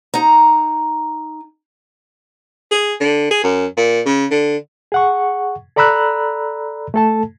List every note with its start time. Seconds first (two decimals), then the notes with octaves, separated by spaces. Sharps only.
0.14 D#4 A#5
2.71 G#4
3.00 D3
3.31 G#4
3.43 F#2
3.77 A#2
4.06 C#3
4.31 D3
4.92 G#4 F#5 C#6
5.76 A4 D5 A#5 B5 E6 F#6
6.94 A3 A4 A5